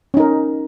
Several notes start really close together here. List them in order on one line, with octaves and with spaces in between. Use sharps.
C#4 D#4 A#4